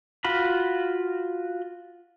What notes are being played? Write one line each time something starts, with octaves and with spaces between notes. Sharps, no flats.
F4 F#4 B5